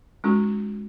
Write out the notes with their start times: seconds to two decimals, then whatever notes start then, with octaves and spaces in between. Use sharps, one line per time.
0.24 G#3 C#4 D#4 F#4